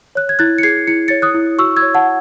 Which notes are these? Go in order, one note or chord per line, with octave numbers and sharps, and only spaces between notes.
C#5 F#6
G#6
E4 F#6 A6
C#7
G#4 G#6 C7
E4 C#7
C#5 A6 C#7
D#6 F#6
E4
F#4 C#6 E6
E6 G#6
C#5
F#5 A5